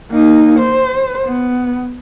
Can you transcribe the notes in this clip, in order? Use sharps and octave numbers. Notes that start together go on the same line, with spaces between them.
A#3 D#4
C5
B3